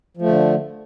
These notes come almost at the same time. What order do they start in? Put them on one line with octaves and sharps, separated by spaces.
F3 A3 D3